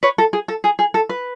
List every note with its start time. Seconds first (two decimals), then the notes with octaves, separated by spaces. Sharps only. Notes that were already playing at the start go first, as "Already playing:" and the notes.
0.03 B4 C#5
0.18 A4
0.33 G#4
0.48 A4
0.64 G#4
0.79 G#4
0.94 A4
1.09 B4